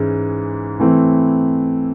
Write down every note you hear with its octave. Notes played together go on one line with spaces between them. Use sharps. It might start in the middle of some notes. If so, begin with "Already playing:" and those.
Already playing: G#2 E3 G#3 C#4
E3 A3 C4 E4